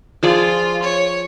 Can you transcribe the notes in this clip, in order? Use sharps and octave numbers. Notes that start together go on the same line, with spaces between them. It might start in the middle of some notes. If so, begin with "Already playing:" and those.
F3 F4 G#4 D5
C#5